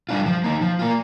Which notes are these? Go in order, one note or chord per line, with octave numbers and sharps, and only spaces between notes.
G3 D4 F4
F3
A#3 D#4
F3
A#3 F4